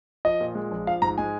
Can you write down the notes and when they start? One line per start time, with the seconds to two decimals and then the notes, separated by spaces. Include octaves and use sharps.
0.25 F3 D#5
0.41 A#2
0.55 G#3
0.71 A#1
0.87 F3 F5
1.02 G#2 A#5
1.18 G#3 G#5